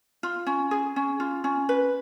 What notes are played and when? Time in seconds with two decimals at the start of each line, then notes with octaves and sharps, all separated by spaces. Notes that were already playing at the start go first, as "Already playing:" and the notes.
0.23 F4
0.46 C#4
0.71 G#4
0.96 C#4
1.20 F4
1.44 C#4
1.69 B4